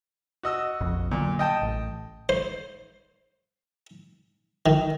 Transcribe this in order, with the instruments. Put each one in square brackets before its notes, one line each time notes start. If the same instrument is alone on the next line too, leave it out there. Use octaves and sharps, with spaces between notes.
[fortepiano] F#4 D#5 E6
[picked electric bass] F1 A#1 F2
[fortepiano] A#2 [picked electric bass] D3 F#3
[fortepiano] D#5 G5 A5
[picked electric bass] A1
[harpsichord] C5
D#3